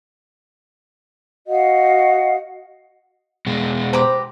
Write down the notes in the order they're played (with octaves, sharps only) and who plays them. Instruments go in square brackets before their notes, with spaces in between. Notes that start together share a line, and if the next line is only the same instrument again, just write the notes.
[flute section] F#4 D#5 F5 F#5
[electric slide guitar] B2 G#3
[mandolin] G4 B4 A#5 [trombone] C5